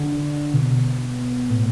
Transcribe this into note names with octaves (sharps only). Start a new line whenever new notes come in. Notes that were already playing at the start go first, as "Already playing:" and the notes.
Already playing: D3
B2
A2